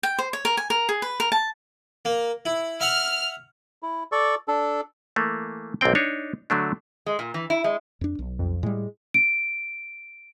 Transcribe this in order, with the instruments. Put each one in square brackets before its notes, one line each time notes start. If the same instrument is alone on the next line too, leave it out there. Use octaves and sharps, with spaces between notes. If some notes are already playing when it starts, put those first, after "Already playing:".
[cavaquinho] G5
C5
C#5
A#4
G#5
A#4
G#4
B4
A#4
A5
[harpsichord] A#3
E4
[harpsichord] E5 F#5 [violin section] F6
[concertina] E4
A4 D5 C#6
D4 A4
[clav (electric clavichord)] E3 A3 A#3
B1 G#2 A#3 C4 G5
D4 D#4 C#5
D3 F#3 A3 D4
[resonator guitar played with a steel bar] G#3
A#2
E3
E4
G#3
[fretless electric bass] F2 D4
B1
[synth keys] F2
[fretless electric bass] A2 G3 [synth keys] G#3
[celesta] D7